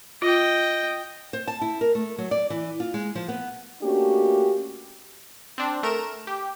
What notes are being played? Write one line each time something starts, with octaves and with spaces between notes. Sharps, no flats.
F4 D#5 G5
C5
A5
E4
A#4
A3
F#3
D5
E3
F4
G#3
F3
B3
A3 A#3 C#4 D4 F#4 G4
C4 D4
A3 A#4 D7 E7
G4